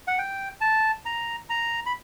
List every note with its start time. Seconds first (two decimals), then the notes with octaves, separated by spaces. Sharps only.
0.07 F#5
0.18 G5
0.61 A5
1.06 A#5
1.49 A#5
1.86 B5